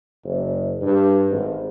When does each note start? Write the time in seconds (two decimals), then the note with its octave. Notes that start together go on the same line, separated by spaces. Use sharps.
0.24 F#1
0.81 G2
1.30 G#1